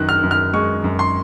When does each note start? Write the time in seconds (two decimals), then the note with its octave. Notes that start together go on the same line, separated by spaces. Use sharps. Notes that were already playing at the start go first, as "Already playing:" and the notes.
Already playing: F#2 D#3 F#6
0.09 F6
0.23 F#2
0.31 F6
0.54 G#3 C#6
0.84 F#2
0.99 C6